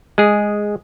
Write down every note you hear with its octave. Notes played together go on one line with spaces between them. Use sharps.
G#3 G#4